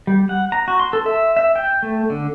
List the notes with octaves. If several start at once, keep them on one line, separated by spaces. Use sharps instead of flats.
G3
F#5
A#5
F#4
C6
A4
E5
E5
G5
A3
D3